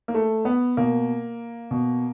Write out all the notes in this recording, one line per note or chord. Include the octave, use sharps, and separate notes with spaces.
A#3
A3
B3
B2 A#3
B2